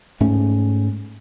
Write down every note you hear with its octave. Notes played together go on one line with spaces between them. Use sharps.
G#2 A3 C#4